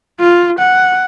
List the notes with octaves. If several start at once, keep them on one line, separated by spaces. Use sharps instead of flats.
F4
F#5